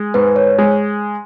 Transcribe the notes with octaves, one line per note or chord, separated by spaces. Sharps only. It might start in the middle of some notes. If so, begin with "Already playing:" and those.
Already playing: G#3
G#2 B4
C#5
G#3